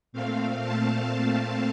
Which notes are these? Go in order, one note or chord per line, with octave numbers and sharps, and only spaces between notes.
A#2 A3 C4 F5
A5